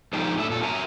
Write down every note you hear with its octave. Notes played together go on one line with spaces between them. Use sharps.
F3 G#3 A3 D4 D#4 G4
A2 A3 D4 E5
A#2 A4
F#4 A#4 E5 G#5 A#5